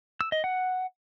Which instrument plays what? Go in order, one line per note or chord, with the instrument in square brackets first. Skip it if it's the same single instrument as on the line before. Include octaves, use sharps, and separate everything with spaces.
[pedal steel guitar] E6
D#5
F#5